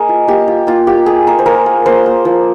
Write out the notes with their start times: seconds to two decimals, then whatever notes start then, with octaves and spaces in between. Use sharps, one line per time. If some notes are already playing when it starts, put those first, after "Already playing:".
Already playing: A#3 G#4 A#4 D#5
0.09 F4
0.27 A#3 G4
0.48 F4
0.67 A#3 F4
0.87 A#3 G4
1.06 F4 G#4
1.27 A#3 A#4
1.39 C5
1.46 A#3 A#4
1.66 A#3
1.86 A#3 C5
2.06 A#3
2.25 F3